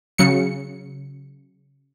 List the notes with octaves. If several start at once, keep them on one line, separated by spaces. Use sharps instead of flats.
C#3 F#3 C#7